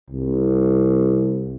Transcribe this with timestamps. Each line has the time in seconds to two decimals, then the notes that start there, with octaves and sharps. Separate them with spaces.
0.10 C2